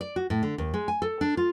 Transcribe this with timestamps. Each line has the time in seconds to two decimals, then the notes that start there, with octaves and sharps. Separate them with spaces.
0.01 D5
0.16 F#4
0.30 A2
0.43 D3
0.58 D#2
0.74 G#3
0.88 G#5
1.02 A4
1.21 D4
1.37 F4